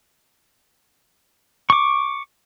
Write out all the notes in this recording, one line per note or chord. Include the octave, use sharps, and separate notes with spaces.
C#6 D6